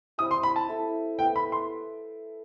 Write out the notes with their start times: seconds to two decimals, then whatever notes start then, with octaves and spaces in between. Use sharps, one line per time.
0.18 G3 C4 E4 G4 D#6
0.31 C6
0.43 B5
0.56 A5
0.68 E4 A4 E5
1.19 B3 E4 B4 E5 G5
1.36 B5
1.52 C6